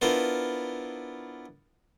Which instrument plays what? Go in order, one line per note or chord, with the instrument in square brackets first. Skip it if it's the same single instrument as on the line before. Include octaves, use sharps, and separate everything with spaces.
[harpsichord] B3 D4 E4 F4 A#4 C5